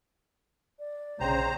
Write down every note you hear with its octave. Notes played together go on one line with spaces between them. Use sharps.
D5
A#1 C#3 C5 G5 A#5